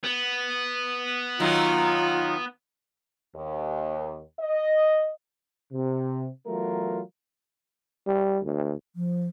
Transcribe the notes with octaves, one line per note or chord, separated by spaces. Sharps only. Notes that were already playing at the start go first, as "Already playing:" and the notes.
B3
D#3 F#3 F4
D#2
D#5
C3
E3 F#3 A3 B3 F4 A#4
G3
D2
F3